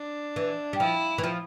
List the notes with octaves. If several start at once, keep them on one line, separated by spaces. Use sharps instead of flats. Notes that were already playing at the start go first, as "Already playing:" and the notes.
Already playing: D4
E3
G3
F3 E4
E3
F3